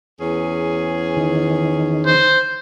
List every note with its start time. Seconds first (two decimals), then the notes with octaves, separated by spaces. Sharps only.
0.20 E2 C#4 G#4
1.17 D#3
2.06 C5